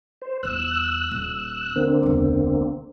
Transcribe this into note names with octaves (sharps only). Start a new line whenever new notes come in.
C5
D#1 E2 E6 F#6
D#1
D#2 D3 A#3 C4
E1 C#2